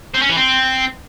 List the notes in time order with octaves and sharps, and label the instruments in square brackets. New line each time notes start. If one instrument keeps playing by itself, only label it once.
[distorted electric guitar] C4
C#4
E3
C4